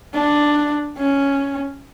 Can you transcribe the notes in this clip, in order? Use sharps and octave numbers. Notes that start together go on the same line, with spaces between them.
D4
C#4